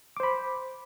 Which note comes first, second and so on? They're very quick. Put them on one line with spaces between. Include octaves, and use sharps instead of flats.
D6 C5 B5